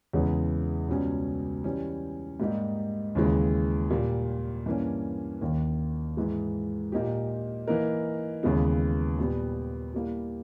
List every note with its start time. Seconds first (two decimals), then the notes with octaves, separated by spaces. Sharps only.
0.13 E2 C#3 E3 G#3
0.89 C#2 B2 G3 C#4 G4
1.64 E3 G3 C#4
2.40 G#2 G3 A#3 D#4 G4
3.15 D#2 C#3 E3 G#3
3.90 A#2 G3 A#3
4.66 G2 E3 A#3 C#4
5.41 D#2 D#3 A#3
6.17 G#2 E3 G#3
6.92 A#2 A#3 D#4 G4
7.68 E3 A#3 D#4 A#4
8.43 D#2 C#3 E3 G#3 B3
9.19 A#2 G3 B3
9.94 G3 A#3 E4